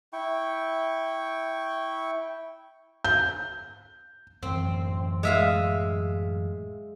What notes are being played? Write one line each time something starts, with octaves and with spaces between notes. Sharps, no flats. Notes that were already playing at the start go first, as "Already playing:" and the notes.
E4 G5 C#6
G6
F#2 A2 E3 C4
G#3 E5 F5